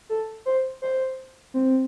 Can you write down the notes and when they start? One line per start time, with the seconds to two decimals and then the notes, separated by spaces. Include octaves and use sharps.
0.09 A4
0.46 C5
0.82 C5
1.54 C4